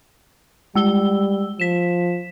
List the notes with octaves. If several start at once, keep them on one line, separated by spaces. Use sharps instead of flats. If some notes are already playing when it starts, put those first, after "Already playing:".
G3 G#3 E6 G7
F3 B6 E7